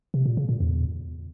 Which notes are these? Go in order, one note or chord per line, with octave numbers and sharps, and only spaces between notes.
C3
A#2
C#3
A#2
E2